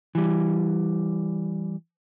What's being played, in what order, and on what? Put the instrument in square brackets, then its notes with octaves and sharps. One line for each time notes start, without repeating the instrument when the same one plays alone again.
[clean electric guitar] E3 G3